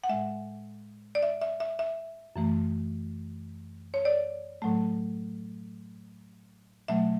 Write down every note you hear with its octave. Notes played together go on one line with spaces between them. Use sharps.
F#5
A2 G#3 E5
D5
E5
E5
E5
E5
F#2 E3 A3
C#5
D5
A2 F#3 A3
B2 F#3 A3 E5